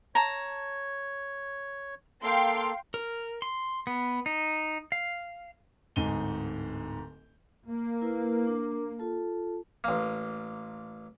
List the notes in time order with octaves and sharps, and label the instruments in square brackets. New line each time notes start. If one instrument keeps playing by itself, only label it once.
[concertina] C#5 [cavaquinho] A5 A#5
[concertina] A#3 A4 [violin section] F5 G5 C6
[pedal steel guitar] A#4
C6
B3
D#4
F5
[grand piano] D1 G#2 D#4 G#5 D#7 G7
[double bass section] A#3
[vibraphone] E4 A#4 B4
D4 A#4 D6
F4 A4 A5
[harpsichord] A1 A#3